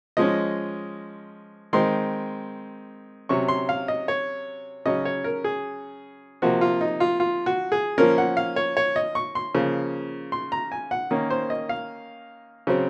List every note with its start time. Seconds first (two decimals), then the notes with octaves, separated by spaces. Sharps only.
0.17 F3 G#3 C#4 D#5
1.73 D#3 G#3 C4 C6
3.29 C3 F#3 C#4 C#6
3.48 C6
3.69 F5
3.88 D#5
4.08 C#5
4.86 C#3 F#3 C#4 D#5
5.05 C#5
5.24 A#4
5.44 G#4
6.42 C3 F3 A#3 F#4
6.61 F4
6.81 D#4
7.00 F4
7.20 F4
7.46 F#4
7.72 G#4
7.98 F3 A#3 C#4 A#4
8.18 F#5
8.37 F5
8.56 C#5
8.77 C#5
8.96 D#5
9.15 C#6
9.35 C6
9.55 C#3 F3 A#3
10.32 C6
10.52 A#5
10.72 G#5
10.91 F#5
11.11 D#3 A#3 C#4
11.30 C5
11.50 D#5
11.69 F5
12.67 C#3 F#3 C4